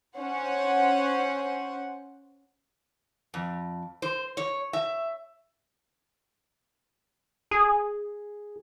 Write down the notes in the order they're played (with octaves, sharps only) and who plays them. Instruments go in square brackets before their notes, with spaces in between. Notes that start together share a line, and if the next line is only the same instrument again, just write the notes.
[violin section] C#4 C5 F#5
[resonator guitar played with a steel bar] F2
C5
C#5
E5
[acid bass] G#4